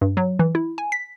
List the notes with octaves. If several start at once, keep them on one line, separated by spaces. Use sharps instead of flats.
G2
F#3
E3
E4
G#5
B6